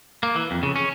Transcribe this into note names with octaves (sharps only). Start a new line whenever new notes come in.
A#3
E3
F2
C#3
C#4